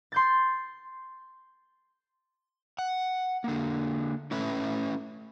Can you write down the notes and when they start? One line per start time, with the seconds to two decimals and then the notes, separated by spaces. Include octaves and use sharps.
0.12 C6 G6 A6
2.79 F#5
3.44 D3 A#3
4.31 A3 C#4 E4 A4 B4